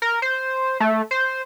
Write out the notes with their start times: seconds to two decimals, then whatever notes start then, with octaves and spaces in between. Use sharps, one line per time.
0.02 A#4
0.22 C5
0.80 A3
1.11 C5